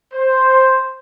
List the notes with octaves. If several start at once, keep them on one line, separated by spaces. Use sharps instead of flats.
C5